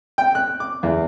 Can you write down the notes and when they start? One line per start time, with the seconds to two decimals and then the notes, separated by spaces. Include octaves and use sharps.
0.18 G5
0.35 F#6
0.60 D6
0.83 E2